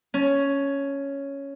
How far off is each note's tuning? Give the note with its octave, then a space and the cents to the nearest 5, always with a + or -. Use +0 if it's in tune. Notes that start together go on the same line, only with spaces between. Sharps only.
C#4 +0 A5 -20